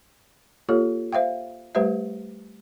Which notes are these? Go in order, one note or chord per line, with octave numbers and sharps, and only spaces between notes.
A#3 F4 G4 A4 C#5
C5 E5 F5 G5
G3 A3 G4 B4 C5 E5